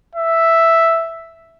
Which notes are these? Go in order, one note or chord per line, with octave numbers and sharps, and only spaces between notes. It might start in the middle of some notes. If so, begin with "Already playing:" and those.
E5